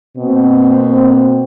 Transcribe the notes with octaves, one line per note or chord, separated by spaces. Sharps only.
B2 A#3 C4